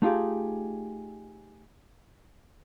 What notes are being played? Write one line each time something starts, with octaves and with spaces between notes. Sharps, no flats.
A3 D#4 F4 G4 G#4